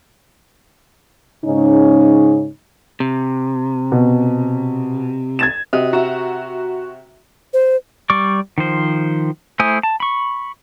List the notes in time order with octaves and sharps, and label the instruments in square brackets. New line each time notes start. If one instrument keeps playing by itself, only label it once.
[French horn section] G#2 C#3 C#4 D#4
[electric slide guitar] C3
[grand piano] B2
G#6 A6 E7
[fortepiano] C3 [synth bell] F#4 D#5 D#6
[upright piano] F#4 [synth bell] E5 A#5
[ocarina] C5
[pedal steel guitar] G3 D5 C#6 D6
D#3 F3 C5
A3 E4 C5 G#5 D#6
A5
B5 C#6